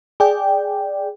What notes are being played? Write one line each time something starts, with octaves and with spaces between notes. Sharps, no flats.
G#4 D5 G5